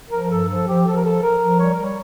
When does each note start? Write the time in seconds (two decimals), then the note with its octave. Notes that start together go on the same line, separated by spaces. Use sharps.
0.10 F3 A#4
0.29 G2 A4
0.47 F3 A4
0.66 F3 G4
0.86 F3 A4
0.95 A#4
1.04 F3 A4
1.22 F3 A#4
1.40 F3
1.59 G3 C#5
1.72 A#4
1.78 G3
1.83 C#5